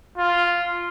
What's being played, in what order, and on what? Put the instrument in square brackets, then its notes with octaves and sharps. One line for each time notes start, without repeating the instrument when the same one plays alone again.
[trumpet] F4